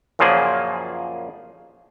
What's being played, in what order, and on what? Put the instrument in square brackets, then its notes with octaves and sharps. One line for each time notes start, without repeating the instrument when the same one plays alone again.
[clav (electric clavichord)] F#2 A#2 C#3 F3 A#3 G#4